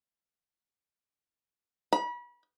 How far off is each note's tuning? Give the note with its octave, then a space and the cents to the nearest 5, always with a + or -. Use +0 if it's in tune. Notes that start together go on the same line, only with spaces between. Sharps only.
B5 -35